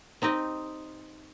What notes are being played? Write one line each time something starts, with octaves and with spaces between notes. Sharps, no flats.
C4 D#4 G4 D#5